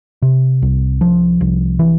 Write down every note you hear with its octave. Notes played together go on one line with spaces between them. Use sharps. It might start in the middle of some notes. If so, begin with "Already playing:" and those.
C3
C2
F3
C2
E3